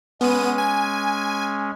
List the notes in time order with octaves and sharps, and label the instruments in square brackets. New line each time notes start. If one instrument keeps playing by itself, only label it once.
[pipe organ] G#3 C#4 [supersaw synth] B3 D#7
[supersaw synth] G#5